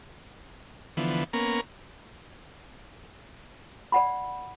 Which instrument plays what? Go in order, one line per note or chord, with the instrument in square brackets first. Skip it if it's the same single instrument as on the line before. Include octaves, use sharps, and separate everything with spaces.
[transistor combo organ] D3 E3 F3 B3
A#3 B3 C#4 A#4
[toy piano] D5 F#5 B5